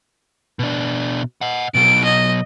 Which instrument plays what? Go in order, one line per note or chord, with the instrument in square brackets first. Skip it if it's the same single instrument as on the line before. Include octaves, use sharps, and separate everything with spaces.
[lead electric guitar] B2 D4
D#5 F#5
[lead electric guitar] B2 F#3 [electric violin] D7
[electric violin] D#5